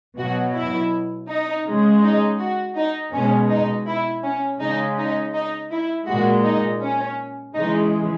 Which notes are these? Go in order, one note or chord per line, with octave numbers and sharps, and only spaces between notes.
B2 F#3 F#4
E4
D#4
C#3 G#3
D#4
F#4
D#4
B2 G#3 C#4
D#4
E4
C#4
C#3 G#3 D#4
D#4
D#4
E4
A#2 G#3 F#4
D#4
C#4
C#3 E3 G#3 D#4